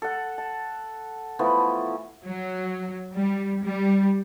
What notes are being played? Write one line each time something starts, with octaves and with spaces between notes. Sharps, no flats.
A4 F#5
A5
E3 F3 A3 B3
F#3
G3
G3